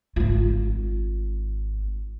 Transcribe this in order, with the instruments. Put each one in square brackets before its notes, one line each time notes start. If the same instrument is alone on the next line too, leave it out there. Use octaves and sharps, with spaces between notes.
[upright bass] G#1 F4